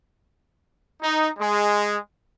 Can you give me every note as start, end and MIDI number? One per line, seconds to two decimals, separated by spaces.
1.02 1.29 63
1.38 1.96 56